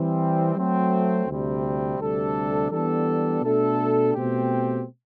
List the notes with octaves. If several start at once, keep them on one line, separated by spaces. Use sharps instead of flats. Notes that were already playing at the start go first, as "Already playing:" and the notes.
Already playing: E3 G3 C4
F#3 A3 C4
D2 C3 G3 C4
D2 C3 G3 D4 A4
E3 G3 B3 D4 A4
B2 A3 D4 A4
B2 A3 C4 G4